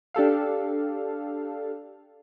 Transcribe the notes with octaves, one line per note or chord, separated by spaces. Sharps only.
D4 G4 A4 F5